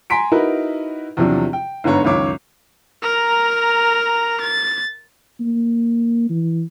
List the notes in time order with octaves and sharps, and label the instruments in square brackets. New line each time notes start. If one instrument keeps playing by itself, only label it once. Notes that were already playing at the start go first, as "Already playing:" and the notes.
[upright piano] G#5 A#5 C6 B6 D7
D#4 E4 F#4 A#4 B4
E2 C3 F3 F#3 D4
G5
G1 G#2 D3 B3 C#5 A#5
C#2 F#2 D#3 C#5 D6
[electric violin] A#4 A#5
A6
[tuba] A#3
E3